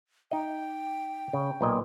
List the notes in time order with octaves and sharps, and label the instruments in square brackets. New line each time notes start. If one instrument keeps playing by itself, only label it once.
[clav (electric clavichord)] D#4 D#5 [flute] G5
[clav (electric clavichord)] C#3
B1 A#2 D#5